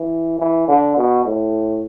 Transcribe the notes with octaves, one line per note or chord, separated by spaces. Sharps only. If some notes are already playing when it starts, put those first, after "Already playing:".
Already playing: E3
E3
D3
B2
A2